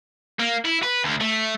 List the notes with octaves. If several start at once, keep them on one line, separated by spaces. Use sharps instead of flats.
A#3
E4
B4
D2
A3